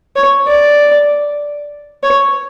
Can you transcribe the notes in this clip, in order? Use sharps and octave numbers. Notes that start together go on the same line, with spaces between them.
C#5
D5
C#5